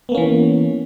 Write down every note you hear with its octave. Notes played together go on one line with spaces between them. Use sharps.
E3 A#3 B3 C#4